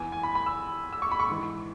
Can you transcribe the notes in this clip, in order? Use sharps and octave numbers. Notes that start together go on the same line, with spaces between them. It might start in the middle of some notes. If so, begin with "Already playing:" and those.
Already playing: E2 E3 G#5
G#5
B5
B5
E6
E6
C#6
B5
C#6
G#2 E3